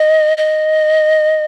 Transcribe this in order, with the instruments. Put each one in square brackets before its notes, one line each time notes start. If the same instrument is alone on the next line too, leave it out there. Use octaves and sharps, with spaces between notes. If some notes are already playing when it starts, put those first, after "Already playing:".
Already playing: [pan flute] D#5
D#5